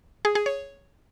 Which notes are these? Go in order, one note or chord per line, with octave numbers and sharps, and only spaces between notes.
G#4
G#4
C#5